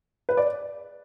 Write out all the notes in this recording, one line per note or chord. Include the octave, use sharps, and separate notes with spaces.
B4
D5